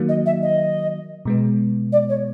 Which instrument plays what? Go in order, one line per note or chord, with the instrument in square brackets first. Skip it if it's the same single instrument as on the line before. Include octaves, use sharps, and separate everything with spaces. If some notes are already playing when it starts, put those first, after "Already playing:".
Already playing: [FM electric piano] D#3 F#3 A#3
[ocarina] D#5
E5
D#5
[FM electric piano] B2 G#3 B3
[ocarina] D5
C#5